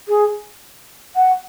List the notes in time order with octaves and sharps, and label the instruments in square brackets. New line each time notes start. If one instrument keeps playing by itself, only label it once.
[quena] G#4
F#5